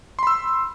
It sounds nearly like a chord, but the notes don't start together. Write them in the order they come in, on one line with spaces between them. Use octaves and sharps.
C6 B5 E6